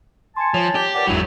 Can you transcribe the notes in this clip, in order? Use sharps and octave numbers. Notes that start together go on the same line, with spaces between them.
G#5 A5 C6 C#7
F3 C#5
G4
A#4 B4 D5 F#5 G6
G1 E2 G#2 F#3 D4 E4